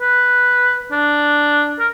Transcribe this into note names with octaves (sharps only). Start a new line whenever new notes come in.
B4
D4
A#4